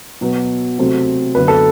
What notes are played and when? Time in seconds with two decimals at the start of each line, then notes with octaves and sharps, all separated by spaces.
0.21 B2 F#3 B3
0.79 C3 F#3 A3 C4
1.35 F#2 D3 F#3 B3 B4
1.48 A4